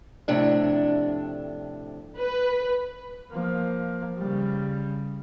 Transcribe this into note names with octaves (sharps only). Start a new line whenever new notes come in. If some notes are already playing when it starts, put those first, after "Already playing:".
F2 A2 C3 D4
B4
F3 A#3
C#3 G3